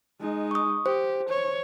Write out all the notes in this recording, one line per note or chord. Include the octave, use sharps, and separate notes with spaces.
G#3 D#4
C#6 D#6
G4 C5
C#5